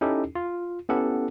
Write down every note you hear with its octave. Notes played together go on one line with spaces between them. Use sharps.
C#4 D#4 E4 G4 A4
F4
B3 C#4 E4 G4 A4 F#5